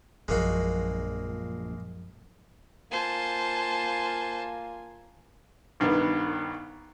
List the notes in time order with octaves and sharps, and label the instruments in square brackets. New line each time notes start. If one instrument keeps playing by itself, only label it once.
[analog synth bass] A#1 [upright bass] F#2 F3 [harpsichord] G#3 A#3 F#4
[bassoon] A#3 [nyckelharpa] F4 G#5 [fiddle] C5 A5
[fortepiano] C2 G2 D#3 B3